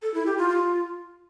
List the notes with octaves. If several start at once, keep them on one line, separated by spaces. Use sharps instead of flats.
A4
E4
G4
F4
F4